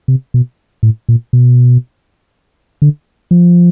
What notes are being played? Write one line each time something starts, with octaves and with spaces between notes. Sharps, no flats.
C3
B2
A2
A#2
B2
D3
F3